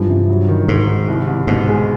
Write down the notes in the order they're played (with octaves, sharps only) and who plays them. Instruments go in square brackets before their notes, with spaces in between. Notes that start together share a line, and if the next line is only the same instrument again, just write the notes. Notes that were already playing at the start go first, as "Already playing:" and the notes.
Already playing: [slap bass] G2 [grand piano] E3 F3
[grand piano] C3
F#3
D#3
[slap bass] G#2 [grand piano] D#3
[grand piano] D#3
C2
C2
[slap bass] G#2 [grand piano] B2
[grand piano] G#3